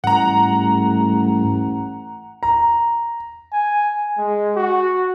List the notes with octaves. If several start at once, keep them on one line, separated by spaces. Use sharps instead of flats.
A1 G#2 G3 A3 F#5 A#5
A#5
G#5
G#3
F#4